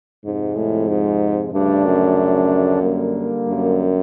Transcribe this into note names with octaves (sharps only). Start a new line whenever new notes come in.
F2 G#2 C3 F3 G#3
A2
G#2
D2 G2 C#3 F3 A3 D4
F#2
D3 G3 A#3
F#2